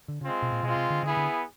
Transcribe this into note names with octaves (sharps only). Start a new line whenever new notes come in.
D3
C#3 G#3 C4 F4
B2
A#2
B2 G#3 C4 F4
C3
D3
D3 B3 E4 G#4
D3